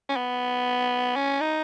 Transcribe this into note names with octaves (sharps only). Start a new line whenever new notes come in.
C#4
B3
C#4
D#4